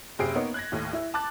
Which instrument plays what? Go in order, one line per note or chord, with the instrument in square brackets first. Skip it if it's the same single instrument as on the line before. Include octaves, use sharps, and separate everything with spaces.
[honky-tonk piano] F#1 C3 G4 G#4 C7 D7
A#3 B3 D#4 C#5
F#6 G#6 A#6
D#2 A2
E4
A5 D6 F#6 A6